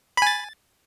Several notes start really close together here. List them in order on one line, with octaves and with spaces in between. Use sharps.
B5 G#5 A6